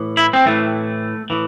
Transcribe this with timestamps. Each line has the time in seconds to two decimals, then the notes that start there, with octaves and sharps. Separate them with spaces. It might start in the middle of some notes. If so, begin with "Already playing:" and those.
Already playing: A2 E3
0.17 E4
0.33 C4
0.45 A2 E3 A3
1.30 A2 E3